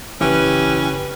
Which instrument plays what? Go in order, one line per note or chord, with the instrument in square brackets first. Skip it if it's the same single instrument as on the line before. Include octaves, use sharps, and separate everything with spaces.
[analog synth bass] F#1 [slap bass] E3 [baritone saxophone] C#4 [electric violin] G4 B4